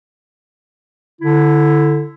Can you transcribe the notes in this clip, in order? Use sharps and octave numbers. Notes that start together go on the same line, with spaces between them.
D3 E4